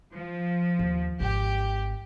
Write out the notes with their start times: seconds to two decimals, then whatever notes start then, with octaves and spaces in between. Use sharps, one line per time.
0.12 F3
0.79 D#2
1.20 G#1 G4